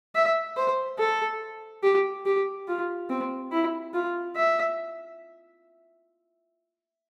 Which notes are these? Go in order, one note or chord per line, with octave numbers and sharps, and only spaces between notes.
E5
C5
A4
G4
G4
F4
C4
E4
F4
E5